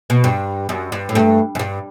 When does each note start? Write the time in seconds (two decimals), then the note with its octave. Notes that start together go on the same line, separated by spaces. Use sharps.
0.10 B2
0.24 G2
0.69 F#2
0.92 G2
1.09 A2
1.14 G2 A3
1.55 F#2
1.59 G2